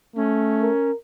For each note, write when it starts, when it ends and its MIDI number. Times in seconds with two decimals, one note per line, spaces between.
0.16 0.70 57
0.16 0.91 61
0.62 0.95 70